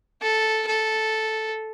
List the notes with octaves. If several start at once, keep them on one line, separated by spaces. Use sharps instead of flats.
A4
A4